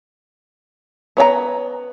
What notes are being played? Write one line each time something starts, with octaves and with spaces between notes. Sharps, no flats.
B3 C#5 G5 A#5